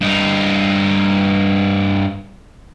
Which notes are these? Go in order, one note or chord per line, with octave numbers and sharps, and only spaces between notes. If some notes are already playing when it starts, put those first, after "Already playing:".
G2 D#4